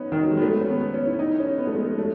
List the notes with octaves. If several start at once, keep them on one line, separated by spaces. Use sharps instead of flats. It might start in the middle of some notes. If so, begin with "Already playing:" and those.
Already playing: B3 C#4 D#4
D#3
F#3
G#3
B3
A3
B3
C#4
B3
B3
C#4
E4
D#4
C#4
B3
A3
G#3
A3
A3